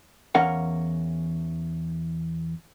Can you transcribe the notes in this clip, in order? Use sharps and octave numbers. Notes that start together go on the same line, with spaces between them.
E2 E3 C#4 A#4 F5 F#5